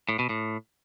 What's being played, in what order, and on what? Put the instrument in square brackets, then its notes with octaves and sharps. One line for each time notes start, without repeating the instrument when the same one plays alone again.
[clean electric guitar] A2
B2
A2